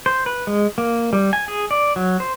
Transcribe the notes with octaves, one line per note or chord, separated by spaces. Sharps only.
C5
B4
G#3
A#3
G3
G#5
G#4
D5
F#3
C5